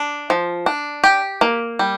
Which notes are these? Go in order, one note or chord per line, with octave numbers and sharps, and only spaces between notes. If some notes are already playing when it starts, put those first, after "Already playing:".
Already playing: D4
F3
D4
G4
A#3
G3